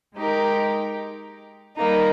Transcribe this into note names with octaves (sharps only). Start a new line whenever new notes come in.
G#3 D#4 G4 A#4
G3 A#3 D#4